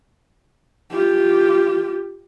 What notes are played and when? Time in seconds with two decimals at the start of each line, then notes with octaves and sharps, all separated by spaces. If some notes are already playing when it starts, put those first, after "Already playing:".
0.91 F4 G4